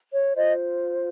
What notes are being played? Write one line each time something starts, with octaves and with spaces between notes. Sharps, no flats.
C#5
F4 C5 D#5